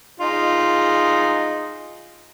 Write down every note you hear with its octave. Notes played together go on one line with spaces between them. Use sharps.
D#4 F4 G#4